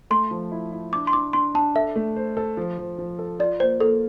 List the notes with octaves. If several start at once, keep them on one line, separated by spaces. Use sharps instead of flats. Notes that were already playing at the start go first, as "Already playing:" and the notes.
A3 C6
F3
E4
E4
D4 D6
C6
D4 D6
D4 C6
D4 A5
A4 E5
A3
C5
A4
F3
F3
F3
A4
F4 D5
A#3 C5
A#3 A4